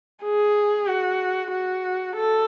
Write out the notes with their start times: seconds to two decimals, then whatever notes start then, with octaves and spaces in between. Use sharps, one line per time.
0.23 G#4
0.87 F#4
1.51 F#4
2.16 A4